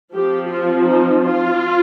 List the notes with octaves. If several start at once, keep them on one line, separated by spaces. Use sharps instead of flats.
F3 C4 G4
F4
D#4
F4